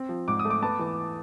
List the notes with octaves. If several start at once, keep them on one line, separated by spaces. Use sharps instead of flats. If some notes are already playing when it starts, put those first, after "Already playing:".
Already playing: C4
F3
G#2 D6
D#6
A3
D6
B3 A5
E3